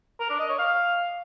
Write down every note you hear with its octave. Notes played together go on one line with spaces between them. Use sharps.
A#4
D4
D#5
C#5
F5